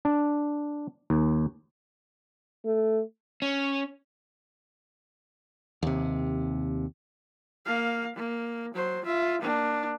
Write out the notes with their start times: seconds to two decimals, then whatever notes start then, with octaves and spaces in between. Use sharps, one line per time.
0.05 D4
1.10 D#2
2.65 A3
3.42 C#4
5.83 D#2 C3
7.66 A#3 F5
8.16 A#3
8.74 F#3 C5
9.05 F4 E5
9.42 A#3 D4